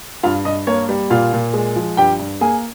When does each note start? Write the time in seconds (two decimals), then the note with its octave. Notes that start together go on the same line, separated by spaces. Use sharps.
0.23 G2 F4 F5
0.45 G2 D#5
0.67 A#3 C#5
0.89 G3
1.10 A#2 F4 F5
1.33 A#2
1.53 G#3
1.76 F3
1.97 G2 G4 G5
2.19 G2
2.41 A#3 G#4 G#5